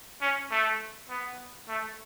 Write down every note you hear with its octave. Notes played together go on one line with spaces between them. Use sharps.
C#4
A3
B3
A3